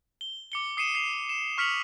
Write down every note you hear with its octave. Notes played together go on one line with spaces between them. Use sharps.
G7
D6 C#7 G7
D#6 C7 C#7 D#7 E7
C7 D#7 F7
E7
C#6 F6 B6 C#7 F7 F#7